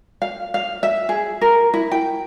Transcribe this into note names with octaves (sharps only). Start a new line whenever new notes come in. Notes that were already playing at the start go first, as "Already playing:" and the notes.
F5
F5
E5
G#4
A#4
E4
G5